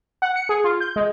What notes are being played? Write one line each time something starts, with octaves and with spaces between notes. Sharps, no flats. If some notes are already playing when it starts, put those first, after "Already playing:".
F#5
C#7
G#4
F4
G6
G#3